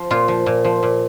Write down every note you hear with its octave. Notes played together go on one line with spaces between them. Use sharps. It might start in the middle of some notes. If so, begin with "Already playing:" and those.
Already playing: F3
A#2 F4
F3
A#2
F3
A#2